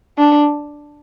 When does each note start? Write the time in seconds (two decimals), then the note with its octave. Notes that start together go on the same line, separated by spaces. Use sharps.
0.18 D4